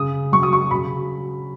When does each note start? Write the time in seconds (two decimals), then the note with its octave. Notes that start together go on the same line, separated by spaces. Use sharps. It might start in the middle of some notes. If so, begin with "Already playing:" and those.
Already playing: C#3 D#6
0.32 F#3 C#6
0.43 D#6
0.53 C#6
0.71 C#3 B5